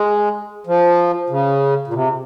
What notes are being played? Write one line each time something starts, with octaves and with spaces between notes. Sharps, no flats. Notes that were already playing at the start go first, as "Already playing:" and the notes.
Already playing: G#3
F3
C#3
A#2
C3